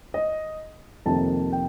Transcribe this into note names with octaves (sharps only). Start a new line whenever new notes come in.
D#5
F2 C3 D#3 A#3 A5
G5